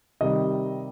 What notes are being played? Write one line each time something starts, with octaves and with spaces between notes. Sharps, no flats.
C3 D#3 G3 D#5